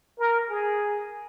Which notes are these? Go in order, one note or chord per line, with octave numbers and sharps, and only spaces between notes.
A#4
G#4